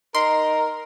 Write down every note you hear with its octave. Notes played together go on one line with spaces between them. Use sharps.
D#4 A#4 C6